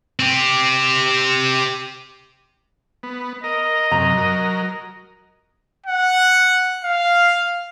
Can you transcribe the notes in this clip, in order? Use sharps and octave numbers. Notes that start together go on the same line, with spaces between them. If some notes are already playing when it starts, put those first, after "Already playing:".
C4 G4
B3
A#4 D#5
F#2 C3 A#5
F#3 A#4
F#5
F5